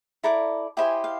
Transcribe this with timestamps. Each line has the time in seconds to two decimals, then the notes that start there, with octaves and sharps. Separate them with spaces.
0.24 E4 A4 D5 A#5
0.77 E4 G4 C5 D#5 G#5
1.04 F5